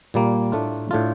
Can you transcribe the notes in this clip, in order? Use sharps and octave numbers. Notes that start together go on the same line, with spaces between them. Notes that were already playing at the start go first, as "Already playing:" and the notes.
A#2 G3 A#3
A2 A3 D4 F4
A2 A3 D4 F4